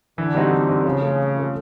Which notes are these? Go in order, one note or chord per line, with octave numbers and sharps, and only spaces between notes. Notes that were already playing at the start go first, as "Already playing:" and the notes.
D3 E3
G3 C4 D#4 F#4
E3
G3 C4 D#4 F#4
C#3 F3
A3 C#4 F4
F3
A3 C#4 F4